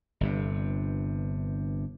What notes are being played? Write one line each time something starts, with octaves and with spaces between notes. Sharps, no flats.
G1 G2 C3